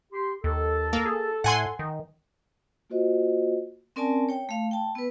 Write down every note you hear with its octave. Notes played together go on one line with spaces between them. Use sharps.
G4 C6
D#2 A4
A#3
G#4
A2 F#5 G#5 C6
D#3
A#3 F4 F#4 C5 D#5
C4 C#4 A#4 D5 G#5 A5
C#5 G5
A3 F5
G5 A5
B3 B4